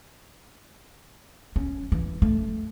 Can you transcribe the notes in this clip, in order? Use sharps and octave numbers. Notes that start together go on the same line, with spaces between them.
C#4
E3
A3